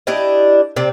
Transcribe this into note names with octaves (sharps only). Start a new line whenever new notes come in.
D4 E4 G4 D#5
C3 C4 D5